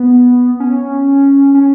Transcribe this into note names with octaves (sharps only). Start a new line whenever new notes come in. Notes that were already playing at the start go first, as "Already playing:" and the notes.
Already playing: B3
C#4
C#4